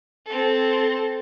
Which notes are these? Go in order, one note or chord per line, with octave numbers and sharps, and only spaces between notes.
C4 A4